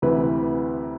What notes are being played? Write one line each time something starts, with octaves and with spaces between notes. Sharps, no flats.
D2 C3 E3 B4